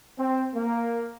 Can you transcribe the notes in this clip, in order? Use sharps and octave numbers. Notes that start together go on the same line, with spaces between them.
C4
A#3